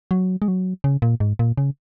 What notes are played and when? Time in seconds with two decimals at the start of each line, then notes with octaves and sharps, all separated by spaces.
0.11 F#3
0.42 G#3
0.48 F#3
0.84 C#3
1.02 A#2
1.20 G#2
1.39 A#2
1.58 C#3